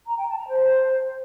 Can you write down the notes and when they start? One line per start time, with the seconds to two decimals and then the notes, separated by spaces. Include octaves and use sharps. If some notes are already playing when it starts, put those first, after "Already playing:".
0.07 A#5
0.17 G5
0.27 A5
0.37 A#5
0.47 C5